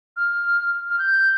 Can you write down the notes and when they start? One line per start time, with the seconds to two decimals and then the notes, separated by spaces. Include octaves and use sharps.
0.17 F6
0.90 F6
0.99 G6